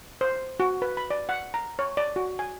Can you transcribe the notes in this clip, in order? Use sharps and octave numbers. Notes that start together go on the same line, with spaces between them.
C5
F#4
B4
B5
D5
F#5
A#5
C#5
D5
F#4
G#5